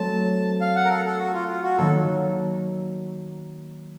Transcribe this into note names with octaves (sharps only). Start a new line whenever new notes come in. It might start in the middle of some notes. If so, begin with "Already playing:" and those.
Already playing: F#3 A3 C4 A5
F5
F#5
A#4
A4
A4
F#4
F4
F4
F#4
D#3 F#3 A#3 A4